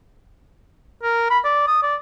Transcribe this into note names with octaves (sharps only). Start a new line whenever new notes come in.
A#4
B5
D5
D#6
D5